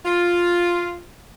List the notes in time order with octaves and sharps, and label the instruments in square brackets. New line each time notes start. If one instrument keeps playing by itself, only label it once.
[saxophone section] F4